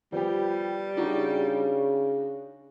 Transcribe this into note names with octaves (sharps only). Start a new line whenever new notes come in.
F3 G3 B3 G4
C#3 D4 D#4 F#4